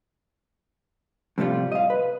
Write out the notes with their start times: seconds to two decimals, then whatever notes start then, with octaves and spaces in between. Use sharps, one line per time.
1.38 F2 A2 C3 G3 F4
1.72 D#5 F5
1.90 B4